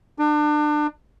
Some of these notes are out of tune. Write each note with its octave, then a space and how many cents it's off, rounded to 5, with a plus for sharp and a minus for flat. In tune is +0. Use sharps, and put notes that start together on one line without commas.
D4 +30